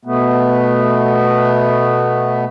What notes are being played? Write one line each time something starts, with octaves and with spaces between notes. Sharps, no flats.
B2 A3 B3